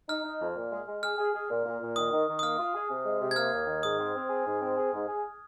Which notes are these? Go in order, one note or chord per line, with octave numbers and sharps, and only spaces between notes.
D#4 F6
D#4
F2
A#2
G#3
G#3
G#4 F6
G#4
G#4
A#2
A#2
A#2
D#3 D#6
D#3
D#3
D#6
A#3 F6
F4
G#4
C3
G#3
C3
G#6
A#3 F6
D#2
D#3
G#2 D#6
C4
C4
G#4
G#2
C4
G#4
G#2
G#4